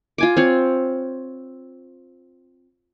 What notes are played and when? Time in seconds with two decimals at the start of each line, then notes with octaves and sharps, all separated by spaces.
0.18 F4 G#5 D6
0.37 C4 F4 C#5